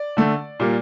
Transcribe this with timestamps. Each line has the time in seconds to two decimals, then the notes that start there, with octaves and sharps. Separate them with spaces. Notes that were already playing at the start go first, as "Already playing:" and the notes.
Already playing: D5
0.17 D3 A3
0.60 A#2 G3 A#3